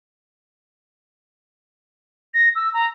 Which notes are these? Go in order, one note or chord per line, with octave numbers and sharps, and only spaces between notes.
A#6
E6
A#5